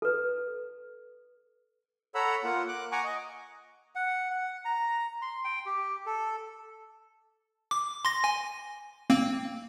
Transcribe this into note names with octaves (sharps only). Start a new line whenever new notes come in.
A4 B4
A4 C#5 F#5 A#5 B5 E6
A#3 F4 F#5
D6 F#6
F#5 G#5 A#5 C#6 D6
D#5
F#5
F#5
A#5
C6
G5
G4
A4
D6
C6 A#6
G#5
A#3 C4